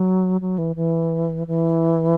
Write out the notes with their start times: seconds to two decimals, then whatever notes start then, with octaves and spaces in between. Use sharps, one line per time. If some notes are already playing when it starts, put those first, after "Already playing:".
Already playing: F#3
0.41 F#3
0.58 E3
0.76 E3
1.47 E3